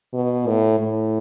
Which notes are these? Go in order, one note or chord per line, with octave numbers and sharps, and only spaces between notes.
B2
A2
A2